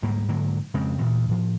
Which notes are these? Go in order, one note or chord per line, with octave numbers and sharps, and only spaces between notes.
D2 G#2 G3 A#3
G#2 D3 F#3 A#3
F2 C#3 G#3 C4
D2 A#2 E3
A2 F3